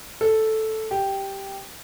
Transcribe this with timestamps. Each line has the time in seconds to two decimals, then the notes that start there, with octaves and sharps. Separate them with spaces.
0.21 A4
0.91 G4